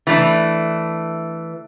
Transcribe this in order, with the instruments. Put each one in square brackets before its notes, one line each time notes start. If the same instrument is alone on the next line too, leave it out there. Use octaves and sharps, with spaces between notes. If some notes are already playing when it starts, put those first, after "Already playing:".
[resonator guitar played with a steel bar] E3 A3 D4